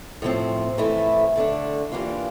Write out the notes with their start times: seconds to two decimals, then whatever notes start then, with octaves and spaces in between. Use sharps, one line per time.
0.22 A2 F3 C4
0.78 A2 E3 A3 E4
1.36 D3 A3 D4
1.92 E3 G3 A#3 D4 F4